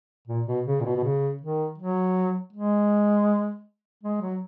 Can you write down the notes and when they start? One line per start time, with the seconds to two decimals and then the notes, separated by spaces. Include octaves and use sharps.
0.28 A#2
0.47 B2
0.66 C#3
0.80 A#2
0.85 B2
0.96 B2
1.04 C#3
1.41 D#3
1.78 F#3
2.53 G#3
4.03 G#3
4.21 F#3